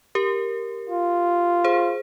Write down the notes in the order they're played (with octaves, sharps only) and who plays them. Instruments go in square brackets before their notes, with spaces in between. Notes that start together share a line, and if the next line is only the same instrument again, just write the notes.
[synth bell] G4 A#4
[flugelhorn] F4
[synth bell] G#4 C5